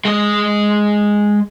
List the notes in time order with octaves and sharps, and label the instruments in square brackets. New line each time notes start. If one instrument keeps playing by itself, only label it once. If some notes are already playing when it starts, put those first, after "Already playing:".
[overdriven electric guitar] G#3 D#5